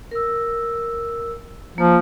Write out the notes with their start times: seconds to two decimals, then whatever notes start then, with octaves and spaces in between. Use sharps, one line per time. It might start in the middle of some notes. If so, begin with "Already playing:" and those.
0.11 A#4 E6
1.78 F3 A#3